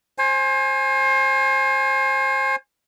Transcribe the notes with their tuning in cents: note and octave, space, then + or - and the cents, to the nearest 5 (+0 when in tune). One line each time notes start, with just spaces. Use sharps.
C5 +30 G#5 +0